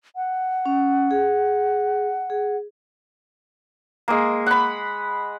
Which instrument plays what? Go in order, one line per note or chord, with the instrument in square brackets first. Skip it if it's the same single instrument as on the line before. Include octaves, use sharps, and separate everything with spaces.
[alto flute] F#5
[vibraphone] C#4
G#4
G#4
[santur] G#3 A#3
F#5 B5